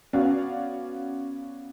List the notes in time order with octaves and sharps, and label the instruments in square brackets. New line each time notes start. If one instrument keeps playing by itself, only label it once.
[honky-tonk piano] B3 C#4 F#4 D5 F5